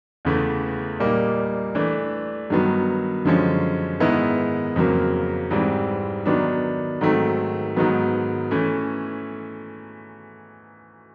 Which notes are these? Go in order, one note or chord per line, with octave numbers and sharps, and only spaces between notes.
E2 C#3 E3 A3
A#2 G3 A#3 D#4
E3 A3 D4
G2 D#3 F#3 B3
F#2 D3 F3 G#3 C#4
G#2 D#3 G#3 B3 E4
F2 C#3 F#3 A#3
G#2 E3 G3 C4
D#3 F#3 B3 D4
G#2 D#3 F#3 A3 C4
G#2 D#3 F#3 B3
E3 A3 C#4